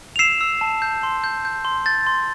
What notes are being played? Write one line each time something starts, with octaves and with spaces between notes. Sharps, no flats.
F7
E6 C7 E7
E6
A5
G6
C6
G6
G6
C6
G6 A6
C6